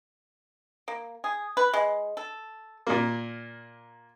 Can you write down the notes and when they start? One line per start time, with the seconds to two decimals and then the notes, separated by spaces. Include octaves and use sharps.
0.88 A#3
1.24 G#4
1.57 B4
1.74 G#3
2.17 A4
2.87 A#2 A#3